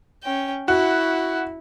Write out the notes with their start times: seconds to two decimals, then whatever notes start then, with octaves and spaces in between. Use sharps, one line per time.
0.23 C#4 G5
0.68 E4 F#4